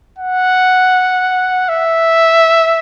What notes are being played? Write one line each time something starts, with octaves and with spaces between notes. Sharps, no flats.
F#5
E5